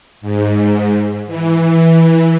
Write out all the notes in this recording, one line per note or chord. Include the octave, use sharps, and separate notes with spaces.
G#2
E3